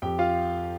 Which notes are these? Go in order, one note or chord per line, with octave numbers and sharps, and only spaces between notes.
F2 G4 G5
F4 F5